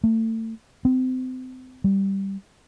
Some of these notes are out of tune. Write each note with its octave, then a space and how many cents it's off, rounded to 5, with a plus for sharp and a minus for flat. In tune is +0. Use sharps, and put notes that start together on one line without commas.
A3 +30
C4 -30
G3 -5